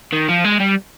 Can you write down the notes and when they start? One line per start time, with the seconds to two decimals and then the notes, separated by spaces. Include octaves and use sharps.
0.13 D#3
0.29 F3
0.44 G#3
0.60 G3